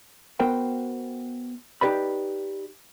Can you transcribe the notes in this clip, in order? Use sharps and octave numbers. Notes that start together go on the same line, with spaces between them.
B3 F#4 A#4 C5 G5
D#4 E4 G4 B4 D5 B5